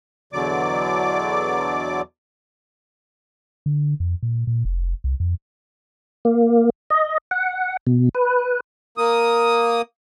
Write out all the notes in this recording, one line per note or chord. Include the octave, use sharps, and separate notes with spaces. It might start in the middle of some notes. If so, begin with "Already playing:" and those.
E2 B2 D3 F#3 D5 D6
D3
F2
A#2
A#2
F1
C2
F2
A#3
D#5
F#5
B2
B4
A#3 D#6